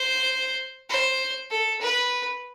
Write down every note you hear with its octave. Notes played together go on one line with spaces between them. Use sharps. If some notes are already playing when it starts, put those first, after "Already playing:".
Already playing: C5
C5
A4
B4